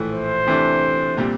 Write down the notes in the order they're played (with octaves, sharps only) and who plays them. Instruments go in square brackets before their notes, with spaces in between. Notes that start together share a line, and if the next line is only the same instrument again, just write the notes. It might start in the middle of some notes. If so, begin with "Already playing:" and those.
Already playing: [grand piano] A#1 A2 E3 A3
[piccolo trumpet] C5
[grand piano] C3 E3 A3 D4
A#2 G3 C4